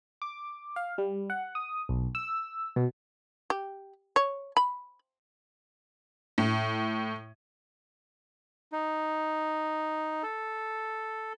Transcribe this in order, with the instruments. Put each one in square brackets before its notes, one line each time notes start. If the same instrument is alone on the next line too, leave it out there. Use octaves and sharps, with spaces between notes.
[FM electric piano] D6
F5
G3
F#5
D#6
B1
E6
B2
[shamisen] G4
C#5
B5
[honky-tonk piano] A2
[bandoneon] D#4
A4